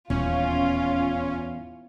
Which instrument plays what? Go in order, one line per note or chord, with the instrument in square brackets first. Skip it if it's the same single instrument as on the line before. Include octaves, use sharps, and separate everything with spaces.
[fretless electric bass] D#1 [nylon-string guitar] E2 [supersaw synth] C#4 [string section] F4